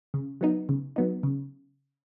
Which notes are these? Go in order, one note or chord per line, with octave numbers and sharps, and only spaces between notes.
C#3
F#3 B3 D#4
C#3
F#3 B3 D#4
C#3